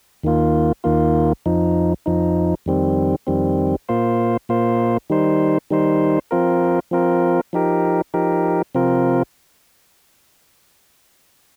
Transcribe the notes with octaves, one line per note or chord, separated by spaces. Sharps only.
D#2 D#3 A#3 F4
D#2 D#3 A#3 F4
F2 F3 D#4
F2 F3 D#4
F2 D#3 G3 C4
F2 D#3 G3 C4
A#2 A#3 F4 C5
A#2 A#3 F4 C5
D#3 G3 D#4 C5
D#3 G3 D#4 C5
F3 C4 F4 A#4
F3 C4 F4 A#4
F3 D#4 G4 A#4
F3 D#4 G4 A#4
C3 F3 C4 F4 A#4